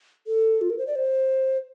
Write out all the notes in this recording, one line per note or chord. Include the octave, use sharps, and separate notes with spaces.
A4
F4
A#4
C5
D5
C5